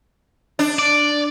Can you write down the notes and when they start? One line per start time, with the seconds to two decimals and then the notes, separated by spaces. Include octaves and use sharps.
0.59 D4
0.79 D5